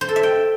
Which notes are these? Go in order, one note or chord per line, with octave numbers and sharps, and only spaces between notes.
C5
A4
E5
G5